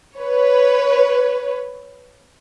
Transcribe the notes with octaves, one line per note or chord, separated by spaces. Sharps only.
B4 C#5